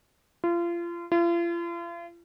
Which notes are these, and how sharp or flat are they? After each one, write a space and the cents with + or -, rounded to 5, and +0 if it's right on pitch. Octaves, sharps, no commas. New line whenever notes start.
F4 -30
F4 -40